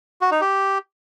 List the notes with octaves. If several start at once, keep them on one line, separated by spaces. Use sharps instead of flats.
F#4
D#4
G4